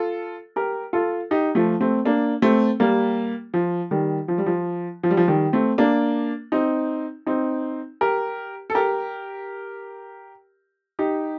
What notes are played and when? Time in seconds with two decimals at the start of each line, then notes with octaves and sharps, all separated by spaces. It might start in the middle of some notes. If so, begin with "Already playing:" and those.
Already playing: F4 A4
0.56 G4 A#4
0.93 F4 A4
1.31 D#4 G4
1.55 F3 A3
1.81 A3 C4
2.05 A#3 D4
2.42 A3 C4
2.80 G3 A#3
3.54 F3
3.91 D#3 G3
4.28 F3
4.38 G3
4.46 F3
5.03 F3
5.11 G3
5.17 F3
5.28 D#3 G3
5.53 A3 C4
5.78 A#3 D4
6.52 C4 D#4
7.26 C4 D#4
8.01 G4 A#4
8.70 A4
8.75 G4 A#4
10.99 D#4 G4